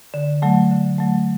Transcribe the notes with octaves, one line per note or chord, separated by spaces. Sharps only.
D3
F#3 A3
D3
F#3 A3